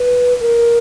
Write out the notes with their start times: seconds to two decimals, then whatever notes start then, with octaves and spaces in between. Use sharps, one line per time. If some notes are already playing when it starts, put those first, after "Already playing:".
Already playing: B4
0.40 A#4